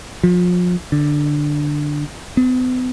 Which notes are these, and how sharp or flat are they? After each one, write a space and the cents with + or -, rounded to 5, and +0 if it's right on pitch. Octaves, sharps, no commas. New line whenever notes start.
F3 +35
D3 +5
B3 +45